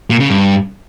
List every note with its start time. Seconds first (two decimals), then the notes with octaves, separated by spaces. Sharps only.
0.10 A#2
0.20 C#3
0.30 G2